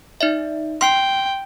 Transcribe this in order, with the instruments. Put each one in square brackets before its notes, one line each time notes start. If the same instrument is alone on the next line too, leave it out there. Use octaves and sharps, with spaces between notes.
[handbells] D#4 D5 E5
[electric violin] G5 [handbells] C6 C7